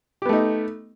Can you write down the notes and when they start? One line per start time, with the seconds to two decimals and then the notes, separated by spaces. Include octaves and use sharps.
0.22 G4
0.25 B3
0.29 A3
0.33 D#4